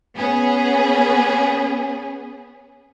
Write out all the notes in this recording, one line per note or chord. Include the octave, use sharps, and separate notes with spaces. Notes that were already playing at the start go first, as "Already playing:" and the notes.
B3 C#4 G#4